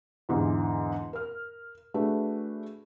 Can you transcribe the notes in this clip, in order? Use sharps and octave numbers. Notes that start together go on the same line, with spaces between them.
E2 G#2 D3 E3
A#4 F6
A3 D4 F#4 G#4 B4